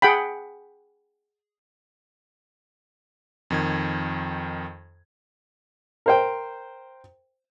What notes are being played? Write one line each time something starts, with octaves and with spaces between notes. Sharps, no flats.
G#4 F#5 G5 B5
F2 D#3 G#6
A#4 C5 G5